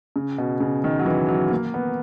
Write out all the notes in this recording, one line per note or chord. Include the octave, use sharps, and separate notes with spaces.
C#3
B2
C#3
D#3
F#3
E3
F#3
A#3
B3